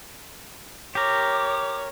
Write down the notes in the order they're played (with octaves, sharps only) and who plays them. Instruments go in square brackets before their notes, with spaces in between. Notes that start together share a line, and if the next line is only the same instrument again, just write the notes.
[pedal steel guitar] G4 A#4 [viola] C#5 [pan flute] D6